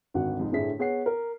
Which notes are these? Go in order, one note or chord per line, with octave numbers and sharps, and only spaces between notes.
G#1 D2 D4 F#4 F#5
F2 G#2 C3
G1 A2 D3 E4 G#4 B6
B3 G#4 C#5 F#5 C7
A#4